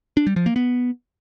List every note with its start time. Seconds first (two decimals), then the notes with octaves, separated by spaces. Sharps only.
0.17 D4
0.27 G3
0.36 F3
0.46 A#3
0.56 B3